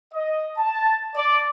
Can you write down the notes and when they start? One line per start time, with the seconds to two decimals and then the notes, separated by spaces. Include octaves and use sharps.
0.14 D#5
0.58 A5
1.16 D5